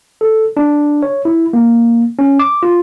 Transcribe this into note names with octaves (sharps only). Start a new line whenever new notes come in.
A4
D4
C#5
E4
A#3
C#4
D6
F4